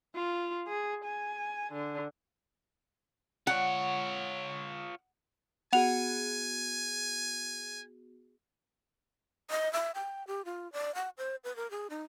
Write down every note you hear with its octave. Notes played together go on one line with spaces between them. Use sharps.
F4
G#4
G#5
D3
F4 C#5 F#5
B3 F#4 G#4 F#5 G#5 F7
D#5
E5
G5
G4
F4
D5
F#5
C5
B4
A#4
G#4
D#4